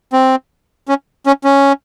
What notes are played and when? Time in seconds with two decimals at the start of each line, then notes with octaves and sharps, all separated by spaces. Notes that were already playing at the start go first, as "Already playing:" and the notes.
0.13 C4
0.89 C#4
1.26 C#4
1.44 C#4